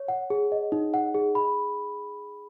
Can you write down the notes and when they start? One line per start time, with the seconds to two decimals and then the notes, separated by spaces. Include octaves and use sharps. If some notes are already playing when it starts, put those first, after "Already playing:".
Already playing: C#5
0.08 F#5
0.30 G#4
0.52 D#5
0.72 D#4
0.94 F#5
1.14 G#4
1.35 B5